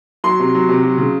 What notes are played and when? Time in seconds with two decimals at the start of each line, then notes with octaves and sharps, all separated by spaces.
0.24 F#3 C6
0.40 C3
0.55 F#3
0.69 C3
0.83 F#3
0.98 C#3